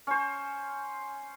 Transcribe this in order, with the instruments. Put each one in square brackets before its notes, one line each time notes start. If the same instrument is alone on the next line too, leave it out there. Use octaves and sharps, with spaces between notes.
[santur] C#4 C5